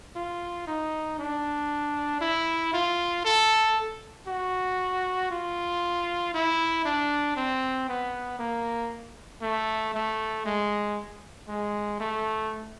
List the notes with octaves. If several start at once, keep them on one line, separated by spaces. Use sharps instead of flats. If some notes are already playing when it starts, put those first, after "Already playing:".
F4
D#4
D4
E4
F4
A4
F#4
F4
E4
D4
C4
B3
A#3
A3
A3
G#3
G#3
A3